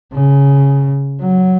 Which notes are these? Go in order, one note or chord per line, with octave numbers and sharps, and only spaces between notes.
C#3
F#3